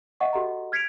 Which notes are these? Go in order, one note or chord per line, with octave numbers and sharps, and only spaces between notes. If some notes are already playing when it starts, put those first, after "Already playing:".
D#5 E5 F#5 C#6
F#4 G4 A4 D#5 F#5 A#5
F6 G#6 B6 C#7 D7 F7